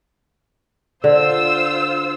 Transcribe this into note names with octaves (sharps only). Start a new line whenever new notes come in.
D3 F4 C5 E6